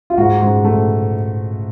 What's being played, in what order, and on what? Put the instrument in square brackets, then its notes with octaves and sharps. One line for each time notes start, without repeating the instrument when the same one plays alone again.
[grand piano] F4
G#2 F#4
G#2
A3